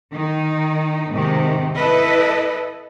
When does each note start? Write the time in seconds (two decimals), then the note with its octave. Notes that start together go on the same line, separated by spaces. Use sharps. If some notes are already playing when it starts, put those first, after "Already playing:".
0.12 D#3 D#4
1.09 G#2 C3 D#3
1.74 E4 A4 B4 D#5